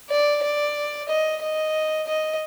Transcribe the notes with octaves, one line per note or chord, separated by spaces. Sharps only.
D5
D5
D#5
D#5
D#5